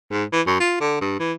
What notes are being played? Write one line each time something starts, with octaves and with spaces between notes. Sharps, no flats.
G#2
E3
F#2
F4
D3
G2
E3